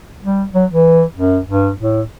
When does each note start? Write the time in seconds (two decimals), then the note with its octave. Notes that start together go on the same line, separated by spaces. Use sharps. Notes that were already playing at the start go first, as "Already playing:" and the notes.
0.23 G3
0.54 F#3
0.70 E3
1.17 F#2
1.49 G2
1.80 A2